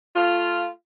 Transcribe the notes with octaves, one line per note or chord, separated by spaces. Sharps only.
A3 F4